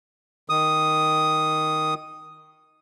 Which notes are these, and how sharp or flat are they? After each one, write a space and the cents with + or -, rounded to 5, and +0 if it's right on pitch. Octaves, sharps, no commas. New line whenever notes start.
D#3 +0 D#6 +0